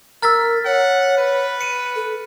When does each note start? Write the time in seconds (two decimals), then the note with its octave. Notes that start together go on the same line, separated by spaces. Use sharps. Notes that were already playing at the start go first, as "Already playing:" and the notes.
0.22 A#4 A#5 E6 F6 A6 B6
0.66 C#5 F#5
1.18 B4
1.61 C#7 D#7
1.96 A4